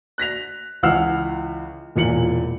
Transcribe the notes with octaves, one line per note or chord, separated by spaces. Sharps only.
F#6 A#6 B6 F7
C#2 E3 F#5 E6 F6 C7
E1 A#2 E3 C#7 F#7